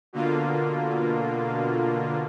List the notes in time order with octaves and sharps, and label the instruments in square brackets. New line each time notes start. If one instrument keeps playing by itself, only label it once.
[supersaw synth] B2 D3 A#3 F4